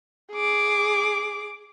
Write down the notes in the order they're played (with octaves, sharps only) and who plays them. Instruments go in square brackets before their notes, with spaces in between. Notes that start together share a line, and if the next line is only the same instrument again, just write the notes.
[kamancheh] G#4 D6